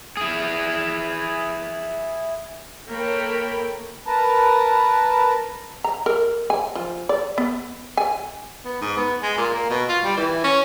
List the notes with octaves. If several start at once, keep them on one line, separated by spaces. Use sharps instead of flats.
E4 G#4
A#3 A4 A#4 C#5 G5 B5
A#4 B4 A5 A#5
A#5
A#4
G#5
F3
D5
B3
G#5
B3
G#2
B3
G#3
A#2
A#3
B2
F4
G3
E3
C#4